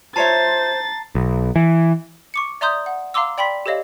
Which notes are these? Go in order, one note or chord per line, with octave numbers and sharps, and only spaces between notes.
F4 C5 C#5 E5 A5 A#5 A6 C7
B1
E3
C#6 D6 C#7
D5 E5 A#5 C6 D#6 G6
F#5
F5 A#5 C6 D6 E6
D5 G5 B5 C6 B6
G4 A4 C#5 D#5 F5